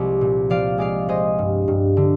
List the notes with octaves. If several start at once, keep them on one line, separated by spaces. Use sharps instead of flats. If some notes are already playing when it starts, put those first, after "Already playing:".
Already playing: C2 F3 G#3 D5
A#2
F3 D5 F5
G#3 D5 F5
G#3 C5 D#5
G2
G2
D3